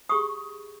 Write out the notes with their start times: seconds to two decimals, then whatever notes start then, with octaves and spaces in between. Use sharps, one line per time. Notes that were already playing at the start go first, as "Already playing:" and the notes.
0.09 G4 G#4 B5 C#6 D#6